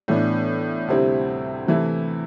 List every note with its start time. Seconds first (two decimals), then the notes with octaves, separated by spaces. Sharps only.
0.08 A2 E3 B3 D4
0.88 D2 C3 G3 C4 E4
1.67 C3 E3 A3 E4